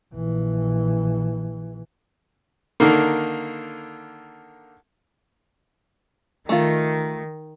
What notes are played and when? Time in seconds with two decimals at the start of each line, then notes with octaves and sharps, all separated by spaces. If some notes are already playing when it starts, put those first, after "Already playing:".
0.14 A#1 E3
2.80 D3 D#3 A#3
6.49 D#3 A3 F4